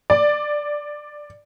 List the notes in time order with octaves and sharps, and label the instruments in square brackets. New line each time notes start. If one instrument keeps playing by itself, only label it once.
[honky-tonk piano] D5